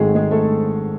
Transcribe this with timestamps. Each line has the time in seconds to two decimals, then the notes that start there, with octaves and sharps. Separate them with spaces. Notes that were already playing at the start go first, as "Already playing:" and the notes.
Already playing: G#1 G#2 D#3 G#3 A3 C4 G#4
0.15 G#3 G#4
0.31 A3 A4